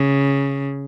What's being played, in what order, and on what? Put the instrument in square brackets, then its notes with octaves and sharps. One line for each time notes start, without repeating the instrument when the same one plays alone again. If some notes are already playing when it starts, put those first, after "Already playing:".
Already playing: [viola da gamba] C#3